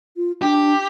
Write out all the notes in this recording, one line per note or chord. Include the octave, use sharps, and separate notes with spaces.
F4
D4 G4